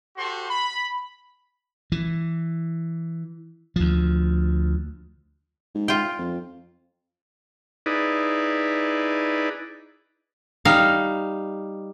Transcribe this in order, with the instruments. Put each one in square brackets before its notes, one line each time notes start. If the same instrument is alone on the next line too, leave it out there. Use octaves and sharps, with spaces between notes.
[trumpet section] F#4 G4 A4 C5 A5 C6
B5
[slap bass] E3
D2 F3
[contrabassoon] G#2
[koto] F4 G5
[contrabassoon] F2
[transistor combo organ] D#4 E4 G#4 B4 D5
[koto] G3 D#4 F5